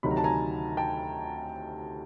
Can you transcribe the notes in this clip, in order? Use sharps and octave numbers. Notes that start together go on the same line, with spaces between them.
D2 C3 D#3 F#3 B5
A#5
A5
G#5 A#5
G5 A5